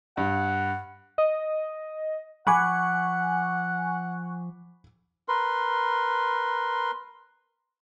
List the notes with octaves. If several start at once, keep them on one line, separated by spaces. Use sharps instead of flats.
G2 F#5
D#5
F3 F#5 G#5 B5 C#6 D6 F#6
A#4 B4 C6